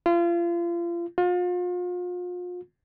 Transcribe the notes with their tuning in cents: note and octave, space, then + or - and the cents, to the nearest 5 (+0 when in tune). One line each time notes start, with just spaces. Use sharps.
F4 -35
F4 +35